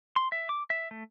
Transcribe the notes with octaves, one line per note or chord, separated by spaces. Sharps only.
C6
E5
D6
E5
A3